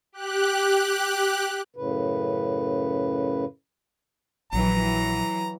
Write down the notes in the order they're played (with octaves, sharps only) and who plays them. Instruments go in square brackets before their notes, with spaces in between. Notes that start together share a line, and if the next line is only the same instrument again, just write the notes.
[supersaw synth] G4 F#6
[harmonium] F#2 A2 C#3 B4
[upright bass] A#1 [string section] E3 F#3 [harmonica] A#5